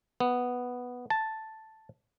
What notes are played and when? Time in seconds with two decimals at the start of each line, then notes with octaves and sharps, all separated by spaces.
0.20 B3
1.10 A5